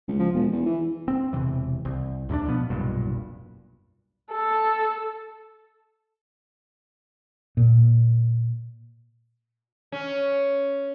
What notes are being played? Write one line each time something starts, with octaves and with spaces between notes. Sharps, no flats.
C#2
F3
E1
E2
E3
C4
E1 C3 E3
C2
D#2 A2 A#3 D4
B2 F3 B3
F1 B1 G2 A#2
A4
A#2
C#4